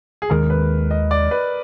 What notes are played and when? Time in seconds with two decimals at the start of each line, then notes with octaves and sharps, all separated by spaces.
0.22 G#4
0.30 D#2 D#3 G#3 A#4
0.50 B4
0.91 D#5
1.11 D5
1.31 B4